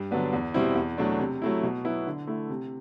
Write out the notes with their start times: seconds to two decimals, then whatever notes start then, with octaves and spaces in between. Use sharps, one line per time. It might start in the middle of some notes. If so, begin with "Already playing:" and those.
Already playing: G2
0.11 D3 F#3 B3 D4
0.33 E2
0.54 B2 G3 C4 E4
0.75 E2
0.98 B2 F#3 A3 D4
1.19 C3
1.42 F#3 A3 E4
1.63 B2
1.85 F#3 B3 E4
2.07 D3
2.27 A3 E4
2.50 C3